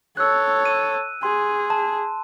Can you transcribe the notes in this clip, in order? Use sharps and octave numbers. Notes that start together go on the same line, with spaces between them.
A4 C#5 E6 F#6
D#7
G#4 C6
A5